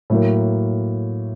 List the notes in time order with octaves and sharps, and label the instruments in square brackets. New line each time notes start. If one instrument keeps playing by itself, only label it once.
[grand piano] A2 F#3 A#3